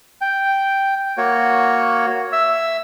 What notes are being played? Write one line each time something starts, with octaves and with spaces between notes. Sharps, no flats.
G5
A#3 F#4 C#5
E5 E6